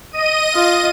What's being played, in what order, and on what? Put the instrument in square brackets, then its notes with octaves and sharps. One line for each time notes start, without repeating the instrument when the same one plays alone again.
[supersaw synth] D#5 D#7
[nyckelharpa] F4